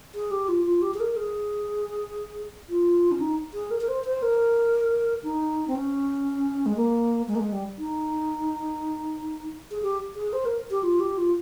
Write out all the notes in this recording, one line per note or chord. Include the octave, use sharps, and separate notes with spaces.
G#4
G4
F4
F4
G4
G#4
A#4
G#4
F4
C#4
D#4
G#4
A#4
A#4
C5
C5
A#4
D#4
C4
C#4
G#3
A#3
G#3
A#3
G#3
G3
D#4
G#4
G4
G#4
C5
A#4
G4
F4
G4
F4